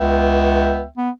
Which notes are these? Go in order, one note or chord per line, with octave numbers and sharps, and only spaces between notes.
C#2 B3 E5 G5
B3